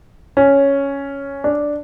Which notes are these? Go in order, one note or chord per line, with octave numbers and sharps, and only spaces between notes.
C#4
D4